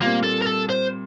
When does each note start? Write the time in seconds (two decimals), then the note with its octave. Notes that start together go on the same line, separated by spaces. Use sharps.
0.01 A#2 G3 A#3 C4
0.24 A4
0.42 A#4
0.47 A4
0.69 C5